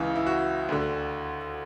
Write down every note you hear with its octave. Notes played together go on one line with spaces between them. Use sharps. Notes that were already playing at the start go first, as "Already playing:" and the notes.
Already playing: C#2 C#3 E3
E4
F#4
D2 D3